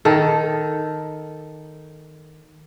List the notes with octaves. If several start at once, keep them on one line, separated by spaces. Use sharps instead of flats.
D#3 A4